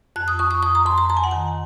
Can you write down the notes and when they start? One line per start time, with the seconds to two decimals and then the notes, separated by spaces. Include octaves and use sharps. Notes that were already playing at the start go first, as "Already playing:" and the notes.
0.16 F2 F#6
0.28 D#6
0.39 F2 C#6
0.51 D#6
0.62 F2 D#6
0.75 A#5
0.86 F2 C6
0.98 A#5
1.09 F2 A#5
1.17 G#5
1.24 F#5
1.31 D#3 G#5